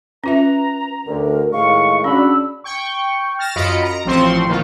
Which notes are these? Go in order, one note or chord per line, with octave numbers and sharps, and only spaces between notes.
C#4 F4 B4 E5 A#5
D2 D3 A#4
A2 D#3 G#3 F5 C#6
C#3 C#4 D4 F#4 B5 E6
G5 C#6
F6 A6 A#6 E7
F#2 F4 D#5 B5 C#7 D7
A#5
A1 F3 C4 C5 C6 C#6
A#2 D#3 A#3 F4